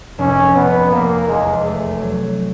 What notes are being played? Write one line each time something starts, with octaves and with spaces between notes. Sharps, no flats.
F1 C#4
F1 B3
F1 A#3
E2 G#3
A3
F#3